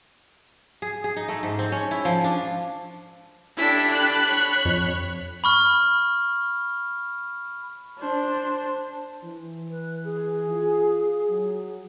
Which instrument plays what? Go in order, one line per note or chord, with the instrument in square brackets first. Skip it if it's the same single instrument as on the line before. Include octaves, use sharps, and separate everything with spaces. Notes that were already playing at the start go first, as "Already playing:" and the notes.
[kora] G#4
G#4
D#4
A3
G#2
C4
C#4
E4
F3
D4
[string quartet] D4 G4 A4 [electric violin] E4 B6
[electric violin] B5 F#6
[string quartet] C#5
[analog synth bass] F2
[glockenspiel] B5 C#6 F6
[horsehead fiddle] D4 C5
[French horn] E3
[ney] B4
G#4
[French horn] F4
F#3